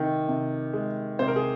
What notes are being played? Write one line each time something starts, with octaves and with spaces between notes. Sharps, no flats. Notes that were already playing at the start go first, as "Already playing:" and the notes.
Already playing: C3 D#3
C3
G#3
C3 C5
A#4
G#4